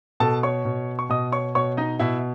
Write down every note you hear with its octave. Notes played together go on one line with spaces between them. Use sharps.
B2 A4 A5
C#5 C#6
B2
C#6
B2 D#5 D#6
C#5 C#6
B2 C#5 C#6
D#4 D#5
B2 E4 E5